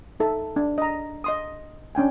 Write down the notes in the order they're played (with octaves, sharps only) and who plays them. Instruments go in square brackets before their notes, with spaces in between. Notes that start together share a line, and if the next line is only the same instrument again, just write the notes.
[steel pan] D#4 A4 E5
D4
D#5 A#5
D#5 C6 D#6
C#4 D4 G5 G#5